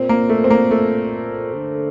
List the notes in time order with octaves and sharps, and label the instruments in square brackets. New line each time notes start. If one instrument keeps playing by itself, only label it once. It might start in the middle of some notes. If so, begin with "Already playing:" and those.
Already playing: [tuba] A#2 [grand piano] C4
[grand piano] A#3
A3
C4
A#3
A3
[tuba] D3